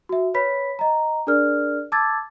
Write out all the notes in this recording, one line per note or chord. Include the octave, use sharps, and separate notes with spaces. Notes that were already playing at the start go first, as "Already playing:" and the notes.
F#4 E5
B4 C#5 B5 B6
D#5 A#5
D4 G#4 A#4 D5 F6
A5 D6 E6 G#6 A6